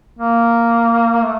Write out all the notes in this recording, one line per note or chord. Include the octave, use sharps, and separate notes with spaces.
A#3
A3